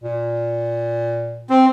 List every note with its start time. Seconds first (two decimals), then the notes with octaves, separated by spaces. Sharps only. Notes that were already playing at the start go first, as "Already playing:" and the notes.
0.03 A#2
1.50 C4